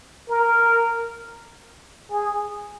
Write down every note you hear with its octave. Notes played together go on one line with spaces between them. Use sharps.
A#4
G#4